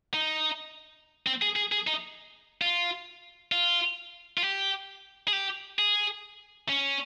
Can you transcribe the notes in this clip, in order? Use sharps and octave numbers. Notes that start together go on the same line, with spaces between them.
D#4
C4
G#4
G#4
G#4
D#4
F4
F4
F4
G4
G#4
G4
G#4
C#4